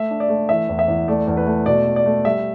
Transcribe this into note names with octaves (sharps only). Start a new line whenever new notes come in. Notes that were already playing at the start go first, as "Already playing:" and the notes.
Already playing: A3 E5
D4
D5
A3
E3 E5
E2
E5
E2
A3 D5
E2
B4
A3
B2 D5
A3
D5
A3
G3 E5